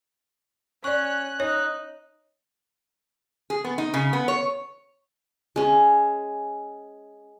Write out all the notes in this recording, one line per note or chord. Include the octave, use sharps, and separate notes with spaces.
C#4 D5 C#6 F#6
D#4 C#5 D#5
G#4
B3
D#4
C#3
B3
C#5
G#3 C#4